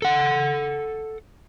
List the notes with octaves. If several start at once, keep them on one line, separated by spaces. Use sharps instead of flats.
A4 F#5